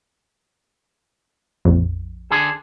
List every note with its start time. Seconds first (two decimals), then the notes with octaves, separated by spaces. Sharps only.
1.65 A#1 F2
2.31 D3 G#4 A4